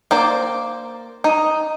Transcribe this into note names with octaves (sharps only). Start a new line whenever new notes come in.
A#3 C5 D5
D#4